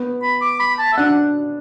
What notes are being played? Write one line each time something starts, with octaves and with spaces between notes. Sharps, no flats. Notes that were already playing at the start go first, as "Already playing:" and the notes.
Already playing: B3
B5
D6
B5
A5
E5
D4 F#5